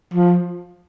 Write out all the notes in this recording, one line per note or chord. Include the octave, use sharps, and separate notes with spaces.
F3